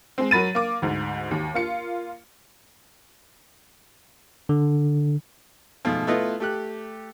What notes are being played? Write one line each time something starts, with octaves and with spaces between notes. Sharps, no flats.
G#3 C4
F#3 A#4 B5 A6 D#7
A#3 D6
D2 G#2
D#2
A#3 F4 C#7
D3
G#2 B2 F3 A3
A3 B3 E4 F4 B4 D#5
A3 G4 F#6